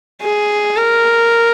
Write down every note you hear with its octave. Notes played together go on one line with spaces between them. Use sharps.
G#4
A#4